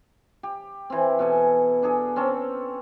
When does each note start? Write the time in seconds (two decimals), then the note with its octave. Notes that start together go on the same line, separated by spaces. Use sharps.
0.43 G4
0.90 E3 C4
1.19 B2 A4 G#5
1.83 D4 G#4 A4
2.16 C4 C#4 A4